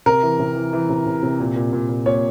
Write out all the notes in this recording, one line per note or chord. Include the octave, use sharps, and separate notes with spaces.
C3 A#4
E3
C3
E3
E3
C3
C3
C3
A#2
A#2
A#2
A#2
A#2 C#5